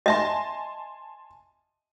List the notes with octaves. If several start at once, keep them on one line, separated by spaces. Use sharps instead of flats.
D#5 E5 G#5 A5 C6